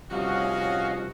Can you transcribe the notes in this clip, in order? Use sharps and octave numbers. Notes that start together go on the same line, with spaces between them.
C3 F3 G3 C#4 F#4 D#5 F5